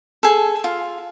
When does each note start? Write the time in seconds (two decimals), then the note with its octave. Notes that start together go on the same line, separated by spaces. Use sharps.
0.23 G#4 A4
0.64 F4